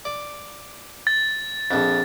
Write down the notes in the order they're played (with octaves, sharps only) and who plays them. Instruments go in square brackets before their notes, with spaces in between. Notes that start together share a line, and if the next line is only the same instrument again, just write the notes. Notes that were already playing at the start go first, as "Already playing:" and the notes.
[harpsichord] D5
[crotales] A6
[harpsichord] A#1 F2